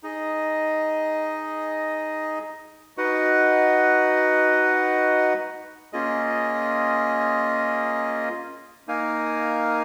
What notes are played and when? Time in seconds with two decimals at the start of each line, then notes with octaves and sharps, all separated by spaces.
0.03 D#4 G#4 D#5
2.97 D#4 F#4 B4 D#5 F#5
5.93 A#3 C#4 F4 G#4 D#5
8.87 A#3 D#4 A#4 F5 G#5